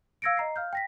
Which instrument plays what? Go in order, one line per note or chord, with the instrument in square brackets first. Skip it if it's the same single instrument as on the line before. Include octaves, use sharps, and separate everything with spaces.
[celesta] F5 E6 G#6 A#6 C#7 D7
D#5 A#5 C7
F5 F6 G6
G5 A#6 B6